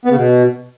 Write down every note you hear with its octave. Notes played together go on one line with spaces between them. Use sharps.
B3
C#3
B2